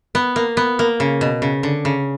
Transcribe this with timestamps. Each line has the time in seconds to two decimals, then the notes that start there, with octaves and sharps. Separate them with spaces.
0.15 B3
0.36 A#3
0.57 B3
0.79 A#3
1.00 C#3
1.21 B2
1.42 C#3
1.63 D3
1.85 C#3